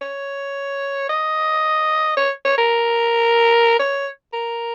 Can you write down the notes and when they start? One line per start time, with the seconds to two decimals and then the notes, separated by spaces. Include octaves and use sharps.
0.02 C#5
1.09 D#5
2.17 C#5
2.45 C#5
2.58 A#4
3.79 C#5
4.33 A#4